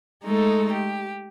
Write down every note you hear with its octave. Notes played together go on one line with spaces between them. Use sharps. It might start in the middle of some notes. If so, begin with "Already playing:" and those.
G#3 A3 D#4 A4
G4